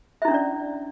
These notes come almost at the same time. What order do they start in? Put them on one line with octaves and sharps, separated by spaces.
E5 E4 D4 C#4 D5